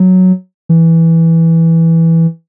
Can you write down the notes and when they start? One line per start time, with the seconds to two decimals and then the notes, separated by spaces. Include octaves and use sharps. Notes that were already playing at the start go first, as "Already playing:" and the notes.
Already playing: F#3
0.69 E3